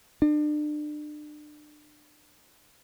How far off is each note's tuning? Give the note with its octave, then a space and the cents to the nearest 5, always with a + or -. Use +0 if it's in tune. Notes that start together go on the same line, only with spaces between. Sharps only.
D4 +35